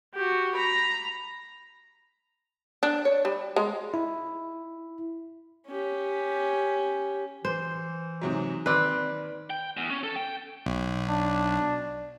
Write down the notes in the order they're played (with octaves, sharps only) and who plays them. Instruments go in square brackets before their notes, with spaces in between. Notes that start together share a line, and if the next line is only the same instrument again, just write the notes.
[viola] F#4 G4
A#5 B5
[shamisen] D4
C#5
G3
G#3
[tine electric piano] E4
[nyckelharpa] C#4 G4
[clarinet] E3 [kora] C5
[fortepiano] G#2 C3 F#3
[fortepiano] D#2 [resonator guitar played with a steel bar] C4 D5 [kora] B4
[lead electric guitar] G5
E2
C#4
A4
G5
[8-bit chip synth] B1
[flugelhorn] D4